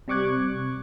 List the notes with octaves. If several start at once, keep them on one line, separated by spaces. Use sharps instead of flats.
C3 G3 C#6 D6 F#6 G#6